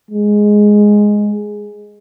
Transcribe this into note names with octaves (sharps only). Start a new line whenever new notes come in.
G#3